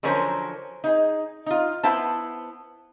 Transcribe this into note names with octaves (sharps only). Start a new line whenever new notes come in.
D3 F3 F#3 C#4 A#4 C5
D#4 G#4
D#4 F4
B3 E4 C5 A5